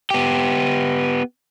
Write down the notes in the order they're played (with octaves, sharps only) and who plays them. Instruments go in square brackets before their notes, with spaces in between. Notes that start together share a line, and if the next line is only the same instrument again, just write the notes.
[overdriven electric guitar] B3 G4